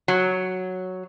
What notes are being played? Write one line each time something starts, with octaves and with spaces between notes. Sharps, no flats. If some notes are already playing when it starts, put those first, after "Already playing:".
F#3